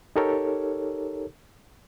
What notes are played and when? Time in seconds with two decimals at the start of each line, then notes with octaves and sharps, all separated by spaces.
0.16 D#4 G4 A4 A#4 C#5